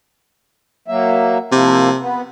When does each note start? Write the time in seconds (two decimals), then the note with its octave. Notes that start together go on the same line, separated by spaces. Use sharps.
0.88 F#3 A#3 E5
1.52 C3 F3 A#3 E4
2.00 B3